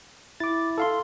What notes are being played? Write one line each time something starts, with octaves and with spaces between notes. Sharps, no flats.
E4 D6 A6
A4 F5 C6